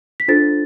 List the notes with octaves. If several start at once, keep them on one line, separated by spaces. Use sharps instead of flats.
B6
D4 F4 A4 C5 A6